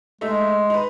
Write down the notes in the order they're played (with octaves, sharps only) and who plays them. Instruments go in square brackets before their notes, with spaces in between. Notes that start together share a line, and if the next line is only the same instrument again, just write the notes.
[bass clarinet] G#3 [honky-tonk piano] A3 D#4 E5
[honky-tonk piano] D#4 B4